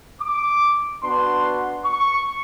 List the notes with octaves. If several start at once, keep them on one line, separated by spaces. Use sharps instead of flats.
D6
B3 D4 F#4 C6
C#6